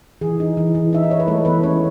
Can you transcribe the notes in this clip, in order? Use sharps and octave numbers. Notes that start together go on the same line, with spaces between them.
E3 G#4
D#4
E3
E3
D#4 E5
D#5
D#4 C#5
B4
G#3 A3 A4
E3 B3 B4
E3 C#4 C#5